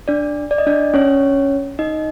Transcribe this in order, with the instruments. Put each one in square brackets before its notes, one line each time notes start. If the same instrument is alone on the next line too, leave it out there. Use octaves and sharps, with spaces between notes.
[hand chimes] D4 D5
D5
D#5
D4 D5
C#4 C#5
D#4 D#5